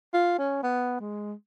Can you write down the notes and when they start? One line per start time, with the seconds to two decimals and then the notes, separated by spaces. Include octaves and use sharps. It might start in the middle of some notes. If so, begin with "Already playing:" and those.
0.14 F4
0.39 C#4
0.63 B3
1.00 G#3